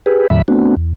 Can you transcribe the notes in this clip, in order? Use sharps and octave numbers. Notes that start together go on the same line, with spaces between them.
G4 G#4 B4
E2 A2 D3 F#3 E5 B5
A3 B3 C4 D4 F#4
E2